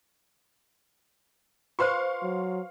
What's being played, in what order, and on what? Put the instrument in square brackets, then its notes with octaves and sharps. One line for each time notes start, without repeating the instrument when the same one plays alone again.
[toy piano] F4 B4 C5 [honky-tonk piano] F5 C6 C#6
[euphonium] F#3